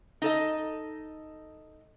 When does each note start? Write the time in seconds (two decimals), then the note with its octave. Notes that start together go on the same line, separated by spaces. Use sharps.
0.22 D#4 A4 D#5